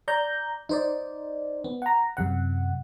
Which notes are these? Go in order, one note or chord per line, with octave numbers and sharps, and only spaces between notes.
D5 A#5 G6
D#4 C5 D5
B3
F#5 A#5
F#2 C3 F#5